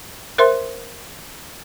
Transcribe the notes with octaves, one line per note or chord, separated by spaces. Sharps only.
A#4 C5 E5 C6